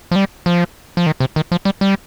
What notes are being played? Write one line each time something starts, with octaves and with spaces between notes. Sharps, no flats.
F3
G3
F3
F3
D#3
C3
D#3
F3
G3
G3